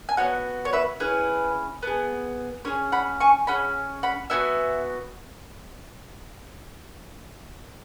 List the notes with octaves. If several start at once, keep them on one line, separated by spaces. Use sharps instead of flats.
G#5
B3 F#4 C#5 F#5
C#5
B4 E5
C#4 E4 G#4 B4
B3 G#4
C#4 G#4 C#5
F#5 B5
G#5 C#6
C#4 G#4 F#5 B5
F#5 B5
B3 F#4 E5 G#5